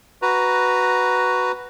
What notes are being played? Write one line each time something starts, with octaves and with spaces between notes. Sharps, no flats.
F#4 B4 A#5